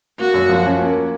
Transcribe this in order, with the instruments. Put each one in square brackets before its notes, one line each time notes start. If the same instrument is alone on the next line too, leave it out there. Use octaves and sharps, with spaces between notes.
[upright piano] A#3 [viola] F#4
[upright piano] F#2
F3
C#4
A#3